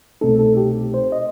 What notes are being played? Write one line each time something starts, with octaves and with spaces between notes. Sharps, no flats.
C2 B2 A3 C4 D#4 A4
A4
G4
C5
D#5